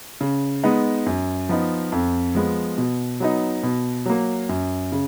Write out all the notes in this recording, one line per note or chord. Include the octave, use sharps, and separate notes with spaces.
C#3
G#3 B3 D#4
F#2
F3 B3 D#4
F2
F3 G#3 B3
B2
F#3 B3 D#4
B2
F#3 A#3
F#2
C#3